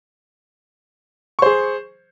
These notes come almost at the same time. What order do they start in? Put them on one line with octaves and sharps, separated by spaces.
C#6 C5 G#4